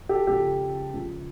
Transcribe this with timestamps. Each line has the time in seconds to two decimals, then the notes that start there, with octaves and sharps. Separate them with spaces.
0.09 G4 A4
0.27 C#2 C#3 F3 G4 A4
0.94 C#2 C#3 F3